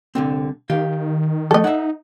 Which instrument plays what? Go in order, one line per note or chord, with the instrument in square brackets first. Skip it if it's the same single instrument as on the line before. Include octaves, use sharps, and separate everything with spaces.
[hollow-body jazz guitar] C2 D3 C4
[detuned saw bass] D#3 [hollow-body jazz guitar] G4 F5
[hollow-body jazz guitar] F3 A3 [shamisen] A4 D#5
[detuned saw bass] D#4 [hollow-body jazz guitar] E5 F#5